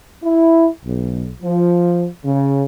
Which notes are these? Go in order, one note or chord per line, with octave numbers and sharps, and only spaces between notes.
E4
B1
F3
C#3